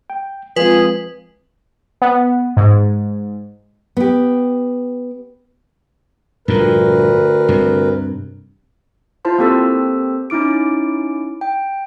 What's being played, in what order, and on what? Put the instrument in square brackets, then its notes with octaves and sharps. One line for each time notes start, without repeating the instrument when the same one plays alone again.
[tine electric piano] G5
[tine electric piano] F3 G#3 C4 [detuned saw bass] F4 [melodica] G#4 [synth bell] B4
[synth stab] B3
G#2
[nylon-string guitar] B3 G4
[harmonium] D2 A#4 B4 [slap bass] G2 A#2 F3
[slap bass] G2 C3
[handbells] E4 F4 C5 A5 C6
A#3 C4 G4 A4 C5 E6
C#4 D#4 E4 D6 D7
G5